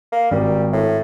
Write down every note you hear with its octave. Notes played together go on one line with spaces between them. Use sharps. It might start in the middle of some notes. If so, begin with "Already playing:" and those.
A#3
G#1 G3
A2